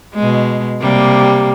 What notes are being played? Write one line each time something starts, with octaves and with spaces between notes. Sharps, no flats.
B2 G#3
C3 G3 A#3